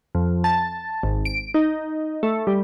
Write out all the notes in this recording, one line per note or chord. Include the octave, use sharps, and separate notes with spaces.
F2
A5
G#1
D7
D#4
A3
G3